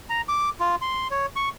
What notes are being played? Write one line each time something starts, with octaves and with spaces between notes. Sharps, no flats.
A#5
D6
F4
C6
C#5
C#6